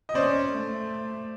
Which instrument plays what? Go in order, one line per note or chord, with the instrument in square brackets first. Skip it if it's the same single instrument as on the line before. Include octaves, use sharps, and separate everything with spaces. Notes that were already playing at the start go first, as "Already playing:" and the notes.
[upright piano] D#5
[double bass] C#4 [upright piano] C5 D5
[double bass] A3